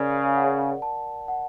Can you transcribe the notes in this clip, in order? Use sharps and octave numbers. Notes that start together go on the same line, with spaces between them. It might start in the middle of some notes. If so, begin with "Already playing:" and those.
Already playing: C#3 A#4 D5
F#5
A5
F#5